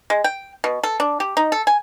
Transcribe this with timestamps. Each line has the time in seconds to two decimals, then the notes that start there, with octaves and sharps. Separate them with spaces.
0.10 G#3
0.24 G5
0.64 B2
0.83 A4
1.00 D4
1.20 G4
1.37 D#4
1.52 A4
1.67 G#5